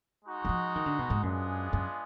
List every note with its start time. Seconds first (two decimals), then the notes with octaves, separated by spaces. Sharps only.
0.25 G#3 D#4 F#4
0.45 D#3
0.49 F3
0.76 D#3
0.86 D3
0.99 B2
1.10 G#2
1.23 F#2 G#3 B3 D4 F4 G#4
1.73 F#2